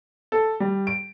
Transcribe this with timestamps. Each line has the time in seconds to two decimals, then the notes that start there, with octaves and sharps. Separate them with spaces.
0.32 A4
0.60 G3
0.87 D7